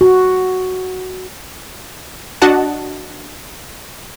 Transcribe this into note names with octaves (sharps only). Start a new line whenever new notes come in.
F#4
D4 F#4 D#5 F#5 A5